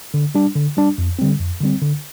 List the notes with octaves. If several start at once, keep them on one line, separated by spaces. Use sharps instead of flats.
D3
G3 D4
D3
G3 D4
F2
D3 G3 C4
F2
D3 G3 C4
D3